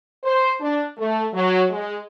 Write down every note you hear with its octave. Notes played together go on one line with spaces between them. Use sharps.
C5
D4
A3
F#3
G#3